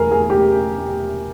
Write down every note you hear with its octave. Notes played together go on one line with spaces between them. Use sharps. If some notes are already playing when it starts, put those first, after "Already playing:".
Already playing: E1 E2 G#4 A#4
G#4
G4